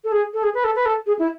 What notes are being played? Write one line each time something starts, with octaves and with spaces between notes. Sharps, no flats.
A4
G#4
A4
G#4
B4
A4
B4
A4
G#4
E4